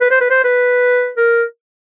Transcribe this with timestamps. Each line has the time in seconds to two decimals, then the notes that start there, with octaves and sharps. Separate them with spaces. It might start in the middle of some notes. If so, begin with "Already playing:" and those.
0.01 B4
0.11 C5
0.21 B4
0.30 C5
0.44 B4
1.17 A#4